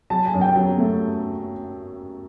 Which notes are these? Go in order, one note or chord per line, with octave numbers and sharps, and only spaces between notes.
F#3 A5
G#5
F#2
G5
F#3
A3